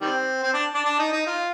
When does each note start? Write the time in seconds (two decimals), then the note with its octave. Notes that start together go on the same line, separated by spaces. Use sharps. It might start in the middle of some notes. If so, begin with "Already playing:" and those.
0.01 D#3 G3 C4
0.43 C4
0.53 D4
0.74 D4
0.85 D4
0.99 D#4
1.13 D#4
1.27 F4